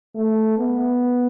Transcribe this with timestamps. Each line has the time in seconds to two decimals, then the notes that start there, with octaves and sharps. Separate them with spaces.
0.15 A3
0.59 B3